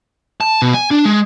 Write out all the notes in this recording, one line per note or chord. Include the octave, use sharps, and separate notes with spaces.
A5
B2
G#5
D4
G#3